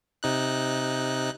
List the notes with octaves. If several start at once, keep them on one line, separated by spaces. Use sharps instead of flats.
C3 D#4 F#6